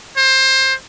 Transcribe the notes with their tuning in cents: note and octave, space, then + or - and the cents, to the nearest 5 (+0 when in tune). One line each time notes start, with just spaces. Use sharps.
C5 +20